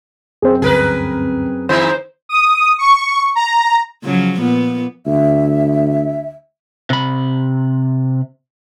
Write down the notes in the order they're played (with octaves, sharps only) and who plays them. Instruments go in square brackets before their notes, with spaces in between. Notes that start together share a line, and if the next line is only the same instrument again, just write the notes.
[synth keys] F#2 C4 [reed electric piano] G#4 C5
[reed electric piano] D2 G2 [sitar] G#4 A#4 B4
[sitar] D#3 G#3 D#4 [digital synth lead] C5
[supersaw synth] D#6
C#6
A#5
[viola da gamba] C#3 F3 F#3
A#2 B3
[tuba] D2 [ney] E5
[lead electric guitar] C3 B5